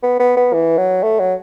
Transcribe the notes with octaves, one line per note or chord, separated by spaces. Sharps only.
B3
B3
B3
E3
F#3
A3
F#3